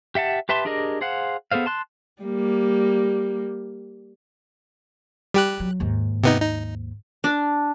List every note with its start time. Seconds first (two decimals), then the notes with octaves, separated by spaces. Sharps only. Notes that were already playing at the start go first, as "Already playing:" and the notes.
0.15 G4 E5 F#5 A5
0.49 G4 B4 E5 A5 C6
0.65 D4 G4 G#4 A#4 D#5
1.01 G#4 C5 F5 F#5
1.52 B3 G#4 A4 C5 F5
1.66 A5 C6 F#6
2.22 G3 A#3
5.34 G3 G4 F#6
5.60 F#3
5.80 D#2 G#2
6.24 C3 B3 D#4
6.41 D#4
7.24 D4